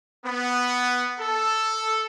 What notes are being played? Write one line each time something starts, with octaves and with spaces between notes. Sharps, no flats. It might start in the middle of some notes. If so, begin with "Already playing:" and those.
B3
A4